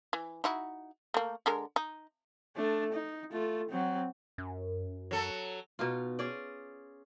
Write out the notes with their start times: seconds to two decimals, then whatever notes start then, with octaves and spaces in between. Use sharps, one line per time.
0.13 E3
0.44 D#4 E4 F#4
1.14 A3 A#3
1.46 D3 G#3 A#4
1.76 D#4
2.56 A3 D4
2.93 D#4
3.32 A3 F4
3.70 F#3 C4
4.38 F#2
5.11 F#3 A4
5.79 B2 D#4 F4
6.19 C#4 G#4 D5